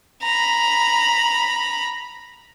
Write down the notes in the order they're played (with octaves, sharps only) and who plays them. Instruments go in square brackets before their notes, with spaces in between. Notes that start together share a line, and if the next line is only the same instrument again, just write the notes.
[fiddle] A#5 B5